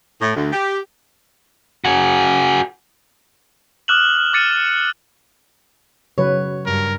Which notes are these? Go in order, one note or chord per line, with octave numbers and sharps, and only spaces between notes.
A2
D2
G4
F#4 G#4
D6 D#6 F6 F#6 E7 F#7
F6
D6 F6 A6 C#7 D#7
C#3 F#3 B4 C#5
G2 A#4